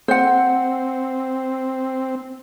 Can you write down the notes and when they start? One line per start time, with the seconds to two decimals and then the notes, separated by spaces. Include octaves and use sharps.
0.08 C4 C5 F#5